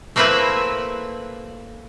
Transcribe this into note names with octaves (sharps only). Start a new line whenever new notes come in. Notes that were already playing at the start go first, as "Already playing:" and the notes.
A3 A#3 C4 E4 B4 E5